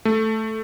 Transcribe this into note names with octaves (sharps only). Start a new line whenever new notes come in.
A3